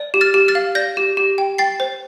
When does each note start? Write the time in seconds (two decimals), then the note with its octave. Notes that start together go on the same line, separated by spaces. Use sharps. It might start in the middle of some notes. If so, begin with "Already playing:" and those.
Already playing: D5
0.14 G4
0.21 F6 A6
0.34 G4
0.48 F6 A6
0.55 F5
0.75 D5 G6 A#6
0.97 G4
1.17 G4
1.38 G5
1.58 G5 A6 C7
1.80 C5